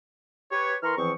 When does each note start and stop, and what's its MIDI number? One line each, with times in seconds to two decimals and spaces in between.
0.52 0.76 67
0.52 0.76 71
0.52 0.76 73
0.83 0.97 52
0.83 0.97 70
0.83 0.97 82
0.83 0.97 84
0.83 0.97 85
0.83 0.97 89
0.97 1.12 40
0.97 1.12 52
0.97 1.12 53
0.97 1.12 60
0.97 1.12 85